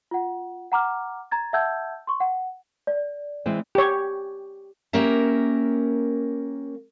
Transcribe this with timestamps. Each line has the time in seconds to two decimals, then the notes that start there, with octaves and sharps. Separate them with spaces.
0.11 F4 F#5
0.72 F#5 A#5 D6 F6
1.31 A#5 G#6 A6
1.53 E5 F#5 A5 E6 G6 G#6
2.07 C6 C#6
2.20 F#5
2.87 D5
3.46 E3 G#3 C4
3.75 G4 C#5
4.93 A#3 C#4 G4 A#4 E5